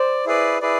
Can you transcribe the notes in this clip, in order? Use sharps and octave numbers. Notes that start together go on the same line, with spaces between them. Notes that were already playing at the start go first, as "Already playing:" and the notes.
Already playing: C5 D5
E4 G#4 B4 D5
E4 G#4 B4 D5